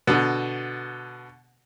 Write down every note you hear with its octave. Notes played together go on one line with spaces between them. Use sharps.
B2 D3